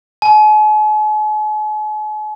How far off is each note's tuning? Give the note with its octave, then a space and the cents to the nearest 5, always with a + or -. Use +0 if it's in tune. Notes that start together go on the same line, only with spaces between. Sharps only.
G#5 +45